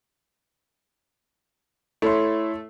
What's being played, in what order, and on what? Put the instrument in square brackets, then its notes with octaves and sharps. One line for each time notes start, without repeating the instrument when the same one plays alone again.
[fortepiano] A3 [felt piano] E4 C#5 C6